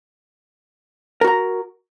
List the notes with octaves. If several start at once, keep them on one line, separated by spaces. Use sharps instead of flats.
F#4 A#4 A#5